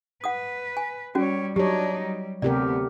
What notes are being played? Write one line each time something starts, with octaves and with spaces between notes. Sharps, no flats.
B4 F#5 D#6
G#5
G3 C#4 F#4 C#5
F#3 D4 D#4 G4 C#5
G3
D2 C3 B3 G4 A#4 D5